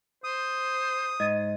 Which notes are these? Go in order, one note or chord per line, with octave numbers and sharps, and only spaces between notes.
C5 D#6
G#2 D#5 A6 D#7